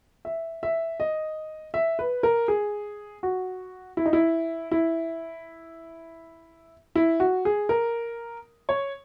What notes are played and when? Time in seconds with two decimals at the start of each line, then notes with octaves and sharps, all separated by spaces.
0.25 E5
0.63 E5
1.00 D#5
1.74 E5
1.99 B4
2.23 A#4
2.48 G#4
3.23 F#4
3.97 E4
4.06 D#4
4.13 E4
4.72 E4
6.96 E4
7.20 F#4
7.45 G#4
7.69 A#4
8.69 C#5